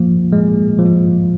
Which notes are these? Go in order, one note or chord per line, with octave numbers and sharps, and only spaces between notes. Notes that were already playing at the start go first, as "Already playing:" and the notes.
Already playing: F3 A#3
G#3
F3